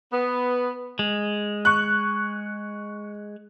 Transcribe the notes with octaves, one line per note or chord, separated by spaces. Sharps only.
B3
G#3
C#6 F#6